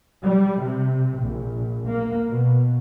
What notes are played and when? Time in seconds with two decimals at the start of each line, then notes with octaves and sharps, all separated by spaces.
0.21 G3
0.57 C3
1.17 A#1
1.85 A#3
2.26 B2